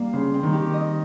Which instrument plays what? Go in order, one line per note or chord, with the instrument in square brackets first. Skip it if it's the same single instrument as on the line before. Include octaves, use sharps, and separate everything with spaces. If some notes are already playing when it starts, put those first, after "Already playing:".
Already playing: [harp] G3 A#3
[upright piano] C#3 [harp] C5
[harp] C4
[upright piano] D#3
[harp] G4
D#5